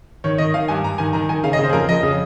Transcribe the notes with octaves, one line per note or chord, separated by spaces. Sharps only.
D#3 C#5
D#3 D#5
D#3 F5
G2 G#5
G2 A#5
D#3 G#5
D#3 A#5
D#3 G#5
C#3 F5
D#5
C#3
C5
G#4
F2 A#4
F2 D#5
C#3